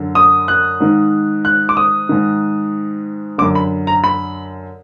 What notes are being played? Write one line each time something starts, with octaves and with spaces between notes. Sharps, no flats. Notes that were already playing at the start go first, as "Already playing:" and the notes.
Already playing: F#2 D3
D#6
F#6
G#2 D#3
F#6
D6
D#6
G#2 D#3
F#2 D3 D6
B5
A#5
B5